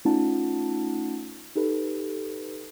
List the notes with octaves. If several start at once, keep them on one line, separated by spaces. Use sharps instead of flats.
A3 C#4 D#4 F4 F#5 A5
D#4 G4 A4 B4